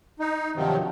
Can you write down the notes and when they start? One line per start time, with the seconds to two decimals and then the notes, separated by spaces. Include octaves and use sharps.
0.19 D#4
0.55 G2 C3 D#3 F3 F#3